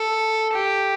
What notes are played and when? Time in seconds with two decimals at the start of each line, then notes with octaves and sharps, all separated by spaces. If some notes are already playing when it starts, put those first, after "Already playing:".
Already playing: A4
0.53 G4